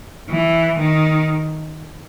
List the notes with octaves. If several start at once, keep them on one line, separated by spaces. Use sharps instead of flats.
E3
D#3